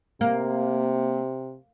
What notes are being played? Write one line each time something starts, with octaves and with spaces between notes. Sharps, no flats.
C3 A#3